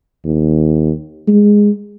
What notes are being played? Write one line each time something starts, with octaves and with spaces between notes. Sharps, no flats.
D#2
G#3